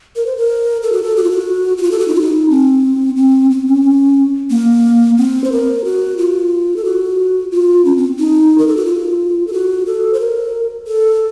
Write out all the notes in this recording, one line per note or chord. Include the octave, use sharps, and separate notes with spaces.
A#4
C5
A#4
A4
F#4
A4
F#4
F4
F#4
F#4
F4
A4
F#4
D#4
F4
D#4
C4
C4
C4
C#4
A#3
C4
C5
A#4
F#4
F4
A4
F#4
F4
C#4
C4
D#4
A#4
A4
F#4
F4
A4
F#4
A4
C5
A#4
A4